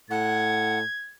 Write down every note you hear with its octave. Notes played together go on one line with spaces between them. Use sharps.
A2 F#5 G#6